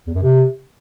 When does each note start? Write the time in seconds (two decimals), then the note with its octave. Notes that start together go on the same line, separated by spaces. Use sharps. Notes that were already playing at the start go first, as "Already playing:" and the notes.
0.07 E2
0.15 F#2
0.23 C3